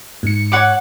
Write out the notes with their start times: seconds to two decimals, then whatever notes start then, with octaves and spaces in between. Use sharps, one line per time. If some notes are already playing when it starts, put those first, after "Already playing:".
0.23 G#2 C#7
0.52 C#5 F#5 D6